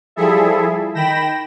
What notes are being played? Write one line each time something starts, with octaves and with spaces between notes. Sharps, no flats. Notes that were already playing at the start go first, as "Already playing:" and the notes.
F3 G3 E4 G#4 A4 E5
D#3 G5 B5 A#6 E7